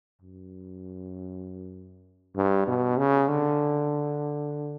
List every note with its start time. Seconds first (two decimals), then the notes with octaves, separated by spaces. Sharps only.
0.21 F#2
2.36 G2
2.67 B2
2.97 C#3
3.28 D3